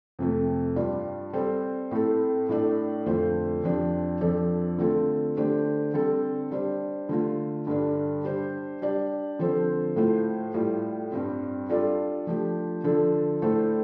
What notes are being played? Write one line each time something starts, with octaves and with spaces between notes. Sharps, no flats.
F2 C3 A3
G2 G3 D4 F4 D5
G3 C4 A4 C5
A2 A3 C4 A4
A2 A3 D4 A4 D5
F2 D3 A3 F4 C5
F2 F3 D4 G4
F2 F3 D4 A4 D5
D3 A3 C4 F4 A4
D3 A3 D4 G4 C5
D3 G3 C4 A4
G3 D4 G4 C5
D3 A3 F4
G2 D3 G3 D4
G3 D4 G4 C5
G3 D4 G4 D5
D3 F3 C4 A4 C5
A2 A3 F4 C5
A2 G3 F4
G2 G3 C4
G3 D4 F4 A4 D5
F3 A3 D4 G4
D3 F3 D4 A4
A2 A3 D4 A4 C5